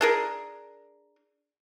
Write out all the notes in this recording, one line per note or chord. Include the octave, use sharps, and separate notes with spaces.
D4 G#4 A#4